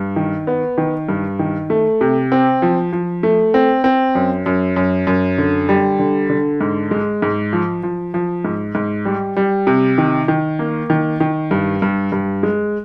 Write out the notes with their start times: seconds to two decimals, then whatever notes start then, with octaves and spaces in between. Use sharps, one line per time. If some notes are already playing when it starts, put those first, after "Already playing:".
Already playing: G2
0.16 D#3
0.47 B3
0.78 D#3
1.09 G2
1.39 D#3
1.70 A3
2.01 C3
2.32 C4
2.62 F3
2.93 F3
3.23 A3
3.54 C4
3.84 C4
4.15 F#2
4.46 F#2
4.76 F#2
5.07 F#2
5.38 D3
5.69 G3
5.99 D3
6.30 D3
6.61 G#2
6.91 G#3
7.22 G#2
7.53 F3
7.83 F3
8.14 F3
8.45 G#2
8.75 G#2
9.05 G3
9.36 G3
9.67 C3
9.98 D#3
10.28 D#3
10.59 A#3
10.90 D#3
11.20 D#3
11.51 G2
11.82 G2
12.12 G2
12.43 G#3